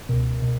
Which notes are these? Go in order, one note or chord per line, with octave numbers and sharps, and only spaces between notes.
C#2 B2 A#4
B2